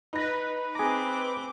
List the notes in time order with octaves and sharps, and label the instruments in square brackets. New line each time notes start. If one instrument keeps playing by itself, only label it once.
[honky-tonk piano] D#4 A#6 [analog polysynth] B4
[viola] C4 D6 [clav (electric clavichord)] G#4 A#5